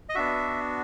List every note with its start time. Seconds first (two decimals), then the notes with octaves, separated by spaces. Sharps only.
0.09 D#5
0.15 B3 D4 F#4 E5